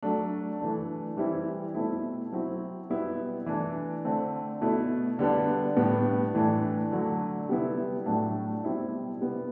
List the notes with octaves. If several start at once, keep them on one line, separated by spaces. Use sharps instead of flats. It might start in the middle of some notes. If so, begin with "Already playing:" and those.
F#3 A3 D4
E3 A3 D4
E3 G3 C4 E4
B2 A3 C4 E4
F#3 C4 E4
B2 G3 B3 E4
E3 A3 D4
D3 A3 C4
B2 A3 E4
D3 G3 B3 D4
A2 G3 B3 D4
A2 E3 A3 D4
D3 F#3 A3
C3 G3 B3 E4
A2 F#3 A3 D4
B2 G3 C4 E4
C3 G3 B3